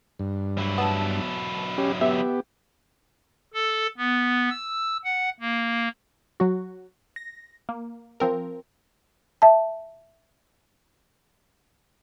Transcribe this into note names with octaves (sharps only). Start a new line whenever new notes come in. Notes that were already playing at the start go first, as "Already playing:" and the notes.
G2
F#3 E4
B3 A5 E6
C#4 G4
B3 G4 E5
A4
B3
E6
F#5
A#3
F#3 F#4
A#6
A#3
F3 C4 A#4
E5 A5